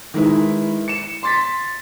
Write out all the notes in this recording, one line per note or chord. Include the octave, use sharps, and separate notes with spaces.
D#3 G#3 D#4 E4 B4
C#7 E7
C6 A6 B6